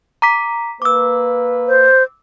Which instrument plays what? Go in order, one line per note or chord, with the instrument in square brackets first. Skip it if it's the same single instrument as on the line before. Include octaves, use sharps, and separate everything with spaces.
[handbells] A#5 D6 B6
[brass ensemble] A#3 B4 [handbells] D6 E6
[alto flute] C5